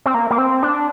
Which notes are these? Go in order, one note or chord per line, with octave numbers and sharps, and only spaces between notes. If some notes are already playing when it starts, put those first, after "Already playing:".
C4
A#3
A#3
C4
D4